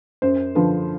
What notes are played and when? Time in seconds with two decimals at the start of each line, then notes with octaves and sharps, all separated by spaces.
0.22 F#2 C5
0.55 D3 F3 B4